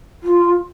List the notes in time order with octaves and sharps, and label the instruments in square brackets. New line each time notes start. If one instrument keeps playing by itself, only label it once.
[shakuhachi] F4